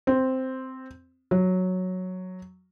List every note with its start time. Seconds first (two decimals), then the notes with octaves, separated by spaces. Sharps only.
0.07 C4
1.31 F#3